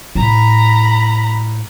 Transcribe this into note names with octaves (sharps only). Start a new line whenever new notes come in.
A2 A#5 B5